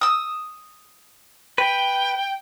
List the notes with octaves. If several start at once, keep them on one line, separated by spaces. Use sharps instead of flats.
D#6 E6
B4 G5